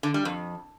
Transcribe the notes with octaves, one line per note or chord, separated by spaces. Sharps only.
D3
G3
F2